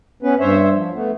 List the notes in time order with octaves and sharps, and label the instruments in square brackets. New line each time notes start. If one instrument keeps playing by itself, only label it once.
[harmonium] B3 C#4 B4
G2 C5 C#5 E5
F3
A3 B3